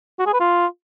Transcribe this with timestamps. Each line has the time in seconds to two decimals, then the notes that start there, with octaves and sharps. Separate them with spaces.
0.19 F#4
0.26 G#4
0.33 B4
0.40 F4